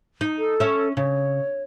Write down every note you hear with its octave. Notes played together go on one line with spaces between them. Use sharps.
D#4
A4
C#4 E5
C#3 C#5